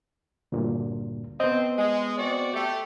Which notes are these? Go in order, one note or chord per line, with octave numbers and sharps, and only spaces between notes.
D2 G2 A#2
B3 C4 D#5
G#3
C4 F#4 D5
A3 G4